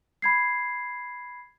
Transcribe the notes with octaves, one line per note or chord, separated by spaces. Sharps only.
B5 G#6 C7